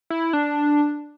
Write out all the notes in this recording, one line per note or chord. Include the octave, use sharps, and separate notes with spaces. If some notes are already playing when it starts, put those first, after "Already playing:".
E4
D4